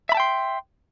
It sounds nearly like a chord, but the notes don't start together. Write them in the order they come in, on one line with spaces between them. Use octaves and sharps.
E5 B5 A5 G5 C6